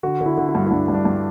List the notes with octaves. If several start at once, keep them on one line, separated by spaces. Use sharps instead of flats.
D3 F#4
D3
E4
D3
E4
G2
E4
G2 D4
G2
D4
G2